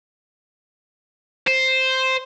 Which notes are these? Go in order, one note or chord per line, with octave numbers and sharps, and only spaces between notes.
C5